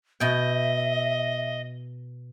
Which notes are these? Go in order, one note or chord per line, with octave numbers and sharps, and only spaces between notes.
B2 D#5 E5 G5